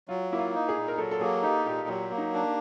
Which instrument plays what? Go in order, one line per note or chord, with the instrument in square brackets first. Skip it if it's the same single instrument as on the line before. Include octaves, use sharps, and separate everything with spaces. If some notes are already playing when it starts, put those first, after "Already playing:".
[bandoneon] F#3 [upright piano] F4
[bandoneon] A#3 [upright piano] E4
[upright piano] F4
[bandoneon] D#4
[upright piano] G#4
[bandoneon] A#2
[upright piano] A#4
[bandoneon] F#3 [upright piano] A4
[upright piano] A4
[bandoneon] A#3 [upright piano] G#4
[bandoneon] D#4 [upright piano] G4
[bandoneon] A#2 [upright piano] G4
[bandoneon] F#3 [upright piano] G4
[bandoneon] A#3
[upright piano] D#4
[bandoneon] D4